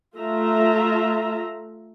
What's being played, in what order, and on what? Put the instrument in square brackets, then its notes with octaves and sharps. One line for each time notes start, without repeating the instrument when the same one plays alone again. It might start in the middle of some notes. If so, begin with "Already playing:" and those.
[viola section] A3 F4 E5 A#5